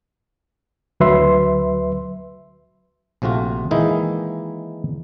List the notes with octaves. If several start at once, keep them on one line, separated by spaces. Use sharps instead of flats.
D2 F#3 B4 E5 C6
A#1 C3 A3 F4 F#4
D#3 E3 G#3 A#3 D#4 E4